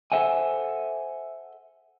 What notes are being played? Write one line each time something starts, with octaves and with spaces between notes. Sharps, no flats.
A4 B4 C5 E5 F#5 G#5